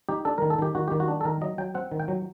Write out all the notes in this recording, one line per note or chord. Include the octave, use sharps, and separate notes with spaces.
D#4 G4
D4 A4
D#3 A#4
A4
D#3 G4
D#3 F#4
D#3 G4
F#4
D4
A4
D#3 A#4
F#3 D#5
F#3 G5
C4 F#5
D#3
G5
F#3